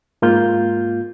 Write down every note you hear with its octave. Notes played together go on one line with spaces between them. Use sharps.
G#2 A#3 F4 G6